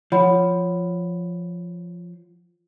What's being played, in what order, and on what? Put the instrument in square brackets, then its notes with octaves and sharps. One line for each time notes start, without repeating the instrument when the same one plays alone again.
[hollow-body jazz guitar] F3 [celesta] C#5 F#5 B5